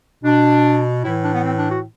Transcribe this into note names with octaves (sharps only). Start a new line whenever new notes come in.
B2 D4
A2 E3 E4
D4
B3
C4
D4
F#4